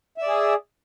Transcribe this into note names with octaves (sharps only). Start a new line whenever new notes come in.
G#4 D5 E5